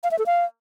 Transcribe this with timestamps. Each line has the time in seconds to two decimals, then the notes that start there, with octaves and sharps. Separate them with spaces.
0.04 F5
0.11 E5
0.19 A4
0.26 F5